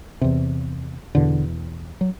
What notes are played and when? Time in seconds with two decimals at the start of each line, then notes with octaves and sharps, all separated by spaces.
0.21 E2 C3
1.15 E2 B2 D3
2.01 F#3